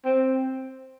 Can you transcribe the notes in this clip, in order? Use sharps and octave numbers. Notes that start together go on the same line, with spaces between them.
C4